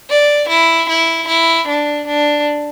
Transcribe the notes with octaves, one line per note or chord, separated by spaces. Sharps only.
D5
E4
E4
E4
D4
D4